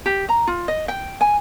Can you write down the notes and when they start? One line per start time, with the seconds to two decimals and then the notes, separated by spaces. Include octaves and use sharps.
0.06 G4
0.29 A#5
0.47 F4
0.68 D#5
0.88 G5
1.21 G#5